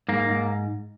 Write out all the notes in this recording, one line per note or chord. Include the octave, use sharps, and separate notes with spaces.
G#2 A#3
G#2